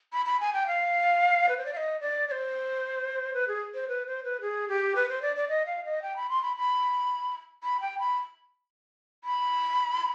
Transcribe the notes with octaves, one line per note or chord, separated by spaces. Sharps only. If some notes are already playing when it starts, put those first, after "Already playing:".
B5
B5
G#5
G5
F5
B4
C5
D5
F5
D#5
D5
D5
C5
B4
G#4
C5
B4
C5
B4
G#4
G4
B4
C5
D5
D5
D#5
F5
D#5
G5
B5
C6
B5
B5
B5
G5
B5
B5